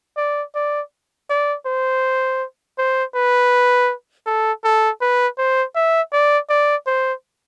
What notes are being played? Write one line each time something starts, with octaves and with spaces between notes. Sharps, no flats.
D5
D5
D5
C5
C5
B4
A4
A4
B4
C5
E5
D5
D5
C5